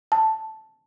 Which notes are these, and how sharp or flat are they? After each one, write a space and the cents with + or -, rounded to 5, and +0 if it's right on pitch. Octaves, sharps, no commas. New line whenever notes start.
A5 -5